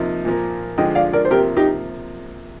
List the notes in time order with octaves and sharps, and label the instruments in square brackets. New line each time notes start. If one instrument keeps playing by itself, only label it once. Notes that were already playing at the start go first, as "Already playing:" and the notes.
Already playing: [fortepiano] C3 F3 A#3 D#4
A#2 F3 A#3
[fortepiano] D3 F3 G#3 [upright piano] D#5 G5
[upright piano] D5 F5
A#4 D5
C5
[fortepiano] C3 F3 A#3 [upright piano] G4 A#4
[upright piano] D#4 G4